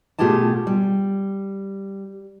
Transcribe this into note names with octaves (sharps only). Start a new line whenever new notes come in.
B2 A3 F4 G4 G#4 A5
G3